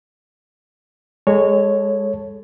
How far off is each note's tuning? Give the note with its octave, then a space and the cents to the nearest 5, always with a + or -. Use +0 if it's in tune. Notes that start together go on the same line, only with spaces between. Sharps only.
G#3 -20 A4 +0 C#5 +0